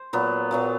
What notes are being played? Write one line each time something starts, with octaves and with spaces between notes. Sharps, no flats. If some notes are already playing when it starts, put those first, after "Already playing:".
Already playing: C5
A#2 F#3 B3
A#2 F#3 B3